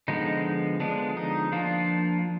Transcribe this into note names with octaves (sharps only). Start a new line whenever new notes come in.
D3 F3 G#3 B3 D#4
D3 F3 G#3 B3 D4
D#4
F3 A#3 D4 F4